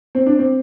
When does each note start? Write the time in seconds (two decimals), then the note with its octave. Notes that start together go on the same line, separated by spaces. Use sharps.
0.15 C4
0.26 D4
0.39 C4